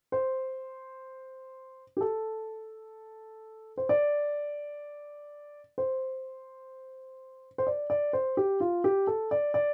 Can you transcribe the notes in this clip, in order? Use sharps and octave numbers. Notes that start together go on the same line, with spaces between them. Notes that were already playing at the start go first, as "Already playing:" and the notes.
C5
G4
A4
C5
D5
C5
C5
D5
D5
C5
G4
F4
G4
A4
D5
D5